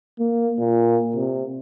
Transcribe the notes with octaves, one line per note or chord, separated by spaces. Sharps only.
A#3
A#2
C3